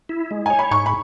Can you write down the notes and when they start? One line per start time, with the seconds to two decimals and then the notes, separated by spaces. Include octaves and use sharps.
0.09 E4
0.31 G#3
0.46 C#5 G#5
0.59 B5
0.71 G#2 C#6
0.86 B5